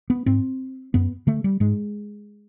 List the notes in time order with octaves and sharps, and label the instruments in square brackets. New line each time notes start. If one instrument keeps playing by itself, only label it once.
[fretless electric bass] B3
G#2 C4
F#2 B3
D3 A3
G3
G#2 G#3